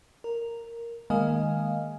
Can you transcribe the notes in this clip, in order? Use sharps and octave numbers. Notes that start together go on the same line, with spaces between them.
A#4
D#3 G#3 A#3 D#5 F5 G#5